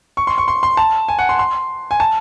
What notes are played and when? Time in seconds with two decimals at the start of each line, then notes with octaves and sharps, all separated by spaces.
0.17 C#6
0.27 C6
0.38 C#6
0.48 C6
0.63 C6
0.77 A5
1.08 G#5
1.19 F#5
1.29 C6
1.39 C6
1.91 G#5
2.00 A5